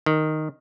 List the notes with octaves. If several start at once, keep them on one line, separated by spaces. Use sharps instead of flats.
D#3